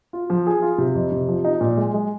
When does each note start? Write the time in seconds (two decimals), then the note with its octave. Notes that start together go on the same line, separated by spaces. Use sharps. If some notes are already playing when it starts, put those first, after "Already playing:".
0.13 F4
0.30 F3
0.47 G#4
0.62 F4
0.78 C3
0.95 F2
1.12 C3
1.28 F3
1.45 D#4
1.61 A#2
1.77 G#3
1.94 G#3